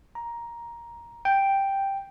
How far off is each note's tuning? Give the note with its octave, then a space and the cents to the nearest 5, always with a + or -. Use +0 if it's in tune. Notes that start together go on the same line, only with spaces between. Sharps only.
A#5 +10
G5 +0